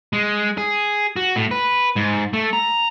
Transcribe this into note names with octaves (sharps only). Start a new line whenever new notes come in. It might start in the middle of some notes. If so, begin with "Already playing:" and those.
G#3
G#4
F#4
A2
B4
G#2
A3
A#5